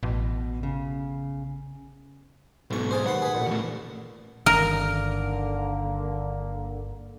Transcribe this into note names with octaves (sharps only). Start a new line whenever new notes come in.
A1 B2
C#3
B1 G#2 B2 C#6
F4 G#4 C5
D#2 B4 F#5 C6
G#4 B4
A1 A#2
E2 A3
G1 D3 D#3 A#3 A#4